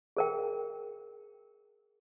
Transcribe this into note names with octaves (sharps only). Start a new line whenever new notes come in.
G#4 A#4 G5